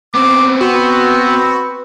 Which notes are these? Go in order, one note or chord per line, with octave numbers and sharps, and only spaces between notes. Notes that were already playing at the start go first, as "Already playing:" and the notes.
B3 C4 D6
B3 C4 F#4 B4